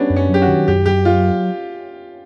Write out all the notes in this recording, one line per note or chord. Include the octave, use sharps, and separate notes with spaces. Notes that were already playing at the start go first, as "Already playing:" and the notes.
Already playing: G3 B3 C#4 D4
F#2
C#4
F#3 G4
F#4
D#3
F#2 G4
F#2 G4
F#3 F4